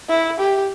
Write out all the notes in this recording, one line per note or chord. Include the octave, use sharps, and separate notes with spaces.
E4
G4